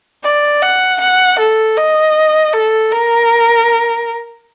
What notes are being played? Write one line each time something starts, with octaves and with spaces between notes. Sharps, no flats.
D5
F#5
F#5
A4
D#5
A4
A#4